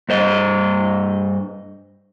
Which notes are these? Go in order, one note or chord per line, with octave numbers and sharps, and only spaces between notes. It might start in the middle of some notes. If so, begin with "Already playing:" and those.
G2 C5 D#5